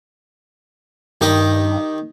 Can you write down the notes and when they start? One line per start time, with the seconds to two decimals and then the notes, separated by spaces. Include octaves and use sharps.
1.21 G2 D#3 G4 D#5